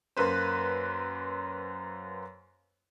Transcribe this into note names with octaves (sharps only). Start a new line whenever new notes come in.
F#2 A#3 B4 C5